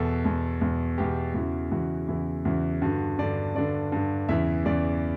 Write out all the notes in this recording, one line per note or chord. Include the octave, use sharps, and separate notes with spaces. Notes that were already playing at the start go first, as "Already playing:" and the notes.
Already playing: E2 B2 A4
E2 B2
E2 B2
E2 B2 G4
E2 C#3 E3 F#4
E2 C#3 E3 F#4
E2 C#3 E3 E4
E2 C#3 E3 F#4
G2 D3 F#4
G2 D3 D5
G2 D3 D5
G2 D3
E2 C#3 E3 E5
E2 C#3 E3 D5